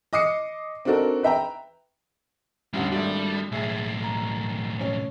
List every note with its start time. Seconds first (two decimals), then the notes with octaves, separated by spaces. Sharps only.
0.13 D#5 D6 D#6 C7 C#7
0.85 C4 D4 D#4 F#4 A4 A#4
1.23 B4 E5 G5 A#5
2.73 A1 E2 D3 G3 C#4
2.92 G#1 G3 A3 D4
3.52 B1 A2 G#4 E5
4.04 A#5
4.81 C#4